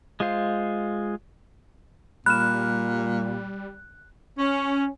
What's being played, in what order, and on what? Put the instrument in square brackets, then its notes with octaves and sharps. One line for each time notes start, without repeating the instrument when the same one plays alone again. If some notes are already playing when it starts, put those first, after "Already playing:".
[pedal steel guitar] G#3 F4 C5 F5
[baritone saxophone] A#2 [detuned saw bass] G3 [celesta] B5 F6 E7 [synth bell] F#6
[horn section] C#4